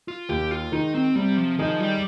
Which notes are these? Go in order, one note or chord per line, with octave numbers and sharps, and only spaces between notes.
F4
D#2 G4
F4
D#3 G#3 D#4
C4
C3 G3
F3
D#3 F3 G#3 D#4 G#4
G3